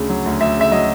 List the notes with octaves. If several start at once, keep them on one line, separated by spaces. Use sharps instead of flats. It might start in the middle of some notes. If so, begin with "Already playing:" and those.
Already playing: D2 C#3
F#3
D2
D2 E5
C#3 E5
F#3 D#5